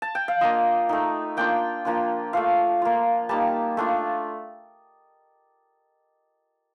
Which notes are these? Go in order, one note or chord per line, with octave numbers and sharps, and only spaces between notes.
A5
G5
F5
A#3 D4 F4 D#5
A3 D#4
A#3 D4 F4 G5
F3 A#3 D4 F4
A3 D4 F4 F5
A#3 F4
G3 A#3 D#4 A5
A3 D4 F4